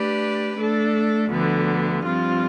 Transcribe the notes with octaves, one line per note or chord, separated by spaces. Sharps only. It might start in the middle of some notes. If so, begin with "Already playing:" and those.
Already playing: A3 D4 G4 B4 D5
A3 D4 A4
D2 D3 F3 B3
G2 F3 C4 F4